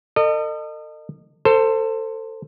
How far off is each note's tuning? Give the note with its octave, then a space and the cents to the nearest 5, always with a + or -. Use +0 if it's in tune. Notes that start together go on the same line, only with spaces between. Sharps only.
A4 +40 D#5 -30
A4 +25 C5 +0